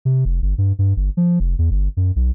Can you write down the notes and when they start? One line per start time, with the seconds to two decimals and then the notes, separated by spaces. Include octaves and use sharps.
0.05 C3
0.25 F1
0.42 G1
0.58 G2
0.79 G2
0.97 G1
1.17 F3
1.40 F1
1.59 E2
1.71 G1
1.97 F#2
2.16 B1